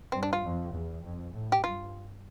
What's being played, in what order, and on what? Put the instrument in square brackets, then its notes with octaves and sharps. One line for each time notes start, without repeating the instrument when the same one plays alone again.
[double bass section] G2 [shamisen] C4
[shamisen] D4
F4
[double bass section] F2
E2
F2
A2
[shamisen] G4
[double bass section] G2 [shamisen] F4